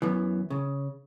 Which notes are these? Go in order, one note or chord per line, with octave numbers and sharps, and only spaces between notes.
F#2 E3 B3
C#3